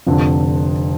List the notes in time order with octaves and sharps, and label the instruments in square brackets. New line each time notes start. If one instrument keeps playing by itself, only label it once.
[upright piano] F1 F2 D3